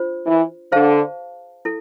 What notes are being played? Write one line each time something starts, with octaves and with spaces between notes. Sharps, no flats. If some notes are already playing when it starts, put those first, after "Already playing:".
Already playing: D4 F4 C5
E3
D3 G#4 C5 F5 A5
E4 A4